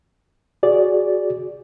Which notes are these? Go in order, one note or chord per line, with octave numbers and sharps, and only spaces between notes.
F#4 G#4 D5